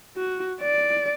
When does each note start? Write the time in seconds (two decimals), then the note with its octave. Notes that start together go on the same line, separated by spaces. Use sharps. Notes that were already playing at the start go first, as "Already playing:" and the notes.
0.17 F#4
0.62 D5